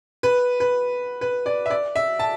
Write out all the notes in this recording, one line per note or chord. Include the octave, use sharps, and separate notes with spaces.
B4
B4
B4
D5
E5
D5
E5
A5